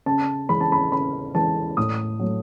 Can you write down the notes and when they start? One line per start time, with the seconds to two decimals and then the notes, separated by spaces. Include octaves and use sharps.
0.06 C#3 A5
0.49 E3 G#3 B5
0.61 A5
0.72 B5
0.92 C#3 B5
1.34 E3 G#3 A5
1.77 A2 D#6
2.19 F#3 A3